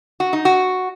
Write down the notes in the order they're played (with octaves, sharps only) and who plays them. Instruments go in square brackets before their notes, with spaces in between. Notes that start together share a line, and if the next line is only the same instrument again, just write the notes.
[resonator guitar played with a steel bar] F#4
D#4
F#4